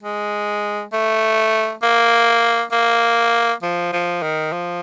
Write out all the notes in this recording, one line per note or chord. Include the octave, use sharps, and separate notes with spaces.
G#3
A3
A#3
A#3
F3
F3
D#3
F3